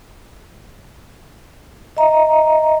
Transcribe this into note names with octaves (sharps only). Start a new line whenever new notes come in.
D#5 E5 A#5